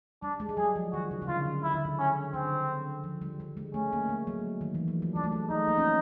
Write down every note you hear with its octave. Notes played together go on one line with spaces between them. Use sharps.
G3 D4
G#3
G3
F#3 G#4
F3
D#3 F#4
C#3
C#3
D3 F4
D3
C#3 E4
D3
C#3
C#4
D3 C4
F3
G3
G3
G#3
A3 C#4
A#3
G#3
F#3
D#3
E3
F3
F#3
G3 D4
A3
G#3
A3 D#4
A#3
C#4
C4